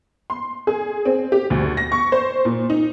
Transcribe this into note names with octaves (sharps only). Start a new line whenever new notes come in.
C6
G#4
C4
G4
D2
A#6
C#6
C5
A#2
D#4